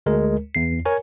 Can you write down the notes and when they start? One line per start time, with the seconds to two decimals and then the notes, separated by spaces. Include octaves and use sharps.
0.06 D2 G#3 A#4
0.55 E2 C7
0.85 A#4 C#5 G#5